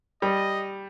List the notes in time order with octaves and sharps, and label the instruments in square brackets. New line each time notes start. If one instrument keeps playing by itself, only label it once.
[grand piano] G3 [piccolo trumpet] D#5